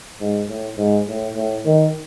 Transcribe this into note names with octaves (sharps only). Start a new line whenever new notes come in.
G#2
A2
G#2
A2
A2
D#3